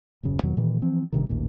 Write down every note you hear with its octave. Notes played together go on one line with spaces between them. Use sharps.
D#1 F#2 C#3
E2 B2 D#3 F#3
A#2 D#3 E3
E3 F3 C4
G1 G2 C3 D#3
A1 D#2 A#2